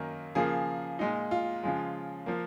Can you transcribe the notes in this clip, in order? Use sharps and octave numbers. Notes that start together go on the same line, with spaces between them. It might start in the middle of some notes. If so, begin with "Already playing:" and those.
Already playing: F#2 D#3 A#3
C#3 F3 A#3 G#4
A#2 G#3 D#4
F4
C#3 F3 G#3
F3 A#3